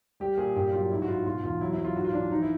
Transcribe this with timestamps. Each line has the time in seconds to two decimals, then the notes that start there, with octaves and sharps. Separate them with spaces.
0.20 G3 G4
0.38 A#2 G#4
0.56 G2 G4
0.73 F#3 F4
0.91 G#2 E4
1.02 F#4
1.08 G#2 F4
1.26 B2 F4
1.43 E2 F4
1.61 F#3 E4
1.73 E4
1.78 F#3
1.85 F4
1.96 G#2 F#4
2.05 F4
2.14 E3 D4
2.30 F3 D#4
2.42 E4